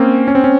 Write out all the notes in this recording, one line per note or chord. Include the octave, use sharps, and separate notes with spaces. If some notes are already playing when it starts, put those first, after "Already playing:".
Already playing: A#3 C4 C#4
C#4
C4
C#4